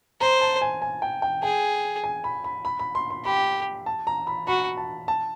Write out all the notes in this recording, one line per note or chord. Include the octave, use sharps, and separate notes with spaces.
C5 A#5
A5
G#5
G#5
G5
G5
G#4 G5
G#5
B5
B5
B5
B5
C6
C6
G4 B5
A5
A#5
B5
F#4 B5
A5
A5